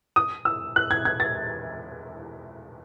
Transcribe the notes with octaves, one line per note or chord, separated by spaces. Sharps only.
D#6
E6
F#6
G#6
G#6
A6